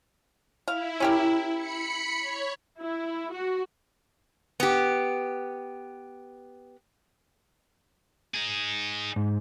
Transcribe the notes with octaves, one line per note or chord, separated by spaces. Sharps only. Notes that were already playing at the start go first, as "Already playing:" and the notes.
E4 F5
C#4 G4 A#4
B5 C#7
C#5
E4
F#4
B3 G4
D#4 G#4
G#2